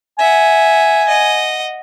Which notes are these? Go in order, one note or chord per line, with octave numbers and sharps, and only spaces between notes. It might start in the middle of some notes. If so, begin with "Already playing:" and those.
E5 F#5 G#5
D#5 F#5